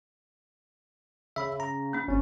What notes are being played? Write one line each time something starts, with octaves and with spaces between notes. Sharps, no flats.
C#3 E5 B5
A#5
A#3 D4
G1 C4 C#4